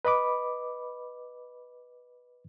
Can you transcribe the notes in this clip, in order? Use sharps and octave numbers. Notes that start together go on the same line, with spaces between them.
B4 D#5 B5 D6